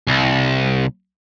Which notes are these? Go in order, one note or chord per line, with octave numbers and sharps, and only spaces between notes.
C2